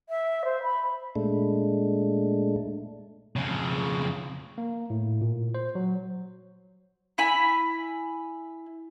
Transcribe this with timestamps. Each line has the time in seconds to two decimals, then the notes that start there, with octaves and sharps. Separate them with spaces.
0.09 E5
0.45 C5
0.63 B5
1.16 A#2 G#3 A3 D4
3.36 F2 C#3
4.58 A#3
4.90 A2
5.21 A#2
5.55 C5
5.75 F#3
7.18 E4 G#5 B5